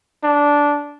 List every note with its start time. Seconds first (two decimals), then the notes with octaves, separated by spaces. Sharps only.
0.24 D4